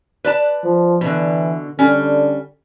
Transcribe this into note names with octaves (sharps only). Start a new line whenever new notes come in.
B4 D5 A5
F3
B2 D3 E3
D3 G3 C#4